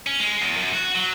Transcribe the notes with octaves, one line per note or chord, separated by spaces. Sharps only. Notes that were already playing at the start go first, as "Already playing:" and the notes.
C#4
G#3
E2
F#2
F#4
F#3